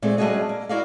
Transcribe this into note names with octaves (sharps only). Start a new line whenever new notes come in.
A#2 G#3 A3 C4
G3 A3 C#4 F#4 G#4 D#5
A#3
E4 F#4 A#4 D5 D#5 F5